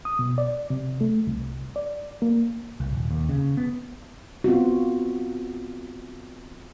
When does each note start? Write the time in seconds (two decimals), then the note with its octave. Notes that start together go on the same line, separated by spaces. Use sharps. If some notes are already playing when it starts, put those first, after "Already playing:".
0.05 D#6
0.19 B2
0.38 D5
0.70 C3
1.01 A3
1.27 C2
1.76 D5
2.22 A#3
2.80 C2
2.93 D#1
3.11 D#2
3.29 C#3
3.57 B3
4.44 B3 C4 F4 F#4